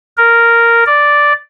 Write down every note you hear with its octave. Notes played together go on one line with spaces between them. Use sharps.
A#4
D5